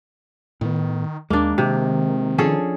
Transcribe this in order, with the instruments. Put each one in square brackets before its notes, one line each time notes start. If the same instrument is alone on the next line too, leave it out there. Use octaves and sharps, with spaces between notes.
[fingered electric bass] A2 B3 [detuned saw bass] D#3
[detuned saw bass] D#2 [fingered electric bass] G#3 [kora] A#3 D4
[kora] C3 [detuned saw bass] D#3
[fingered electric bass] F3 D4 [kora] C#4 G#4 A4